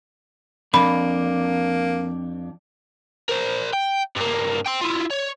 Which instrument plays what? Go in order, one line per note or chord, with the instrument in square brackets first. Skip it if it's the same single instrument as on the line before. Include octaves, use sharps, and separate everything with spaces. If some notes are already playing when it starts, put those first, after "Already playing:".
[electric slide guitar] F2 D4 [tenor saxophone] A#3 [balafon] B5
[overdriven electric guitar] A#4 C5
G5
G2 A#3
G5 C6
E4 F4
C#5